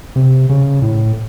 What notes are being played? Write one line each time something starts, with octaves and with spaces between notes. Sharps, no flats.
C3
C#3
A2